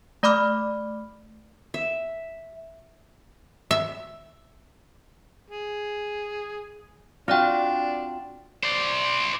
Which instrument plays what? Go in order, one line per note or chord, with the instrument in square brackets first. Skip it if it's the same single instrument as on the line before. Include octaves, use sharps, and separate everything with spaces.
[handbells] A3 D5 B5 D6 F6
[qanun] E5
[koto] E5
[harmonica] G#4
[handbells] C4 D5 G5 [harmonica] D4 [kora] F4 F#4
[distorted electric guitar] C5 D5